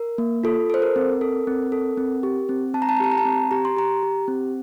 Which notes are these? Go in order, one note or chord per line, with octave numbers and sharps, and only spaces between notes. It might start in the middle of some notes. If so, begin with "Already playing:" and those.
Already playing: A#4
A#3
F4 A4
A4 C5
A#4
C4
A4
C4
A4
C4
G4
C4
C4 A5
A#5
A5
A#5
G4 A5
A#5
A5
C4
G4 A#5
C6
G4 A#5
G4
C4